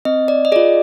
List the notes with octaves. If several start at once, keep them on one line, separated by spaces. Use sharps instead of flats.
C4 D#5
D5
D#5
F4 G#4 D5